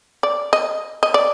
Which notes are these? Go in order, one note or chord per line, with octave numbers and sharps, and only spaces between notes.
D5
D#5
D#5
D5